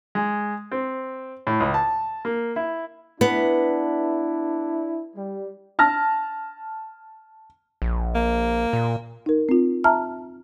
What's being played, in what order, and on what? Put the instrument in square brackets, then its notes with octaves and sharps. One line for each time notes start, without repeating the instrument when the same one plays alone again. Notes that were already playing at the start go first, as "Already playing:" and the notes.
[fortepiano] G#3
C4
A2
C#2
A5
A#3
E4
[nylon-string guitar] B3 [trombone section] D4 E4
[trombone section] G3
[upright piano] A5 F6 A#6
[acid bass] A#1
[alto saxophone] A#3
[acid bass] A#2
[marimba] D#4 A#4
C4 F4
E5 A5 A#5 F6